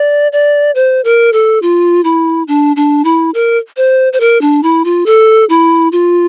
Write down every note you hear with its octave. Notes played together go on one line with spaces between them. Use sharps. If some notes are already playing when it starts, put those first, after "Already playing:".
Already playing: D5
D5
C5
A#4
A4
F4
E4
D4
D4
E4
A#4
C5
C5
A#4
D4
E4
F4
A4
E4
F4